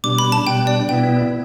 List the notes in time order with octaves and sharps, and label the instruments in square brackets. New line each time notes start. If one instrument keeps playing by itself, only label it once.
[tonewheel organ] B2 G3 D4 [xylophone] D6
[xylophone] B5
A5
[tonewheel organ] B2 G3 D4 [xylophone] G5
[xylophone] D5
[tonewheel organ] B2 B3 E4 [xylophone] G5